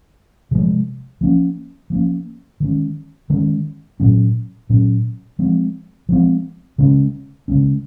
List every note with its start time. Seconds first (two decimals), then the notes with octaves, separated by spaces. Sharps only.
0.51 C3 F3 G#3
1.21 F3 A#3 C#4
1.90 F3 A#3 C#4
2.60 D#3 G#3 C#4
3.30 D#3 G#3 C#4
4.00 A#2 F#3 C#4
4.70 A#2 F#3 C#4
5.39 F3 G#3 C4
6.09 F3 G#3 C4
6.78 C#3 G#3 C#4
7.48 C#3 G#3 C#4